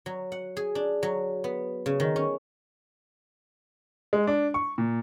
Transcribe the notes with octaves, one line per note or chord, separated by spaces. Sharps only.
F#3
F#5
G#4
D4
F#3
B3
C#3
D#3
C#4
G#3
D4
C#6
A#2